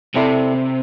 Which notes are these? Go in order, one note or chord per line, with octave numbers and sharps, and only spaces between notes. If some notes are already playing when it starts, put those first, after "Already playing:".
C3 C4 E4 A4 D5